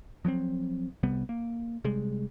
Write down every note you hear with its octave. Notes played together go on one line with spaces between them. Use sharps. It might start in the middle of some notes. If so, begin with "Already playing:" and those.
F3 F#3 B3 C4
C2 C3 G3 B3
A#3
C3 G3 G#3